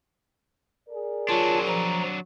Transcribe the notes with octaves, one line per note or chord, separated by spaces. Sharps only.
G#4 A#4 D5
F#3 D4 F4 C#5 A5
F3 A#5